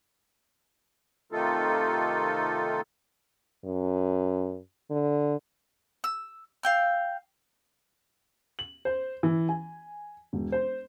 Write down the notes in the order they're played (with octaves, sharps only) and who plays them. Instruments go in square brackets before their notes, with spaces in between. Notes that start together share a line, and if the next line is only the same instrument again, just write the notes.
[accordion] C3 D#3 A3 D#4 F4 A4
[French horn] F#2
D3
[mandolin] E6
F5 G5 E6
[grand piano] F#7
C5
E3
G#5
E1
C5